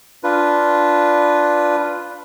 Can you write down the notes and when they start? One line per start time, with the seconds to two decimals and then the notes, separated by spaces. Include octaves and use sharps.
0.24 D4 F4 B4